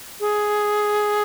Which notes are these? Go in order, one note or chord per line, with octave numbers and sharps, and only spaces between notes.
G#4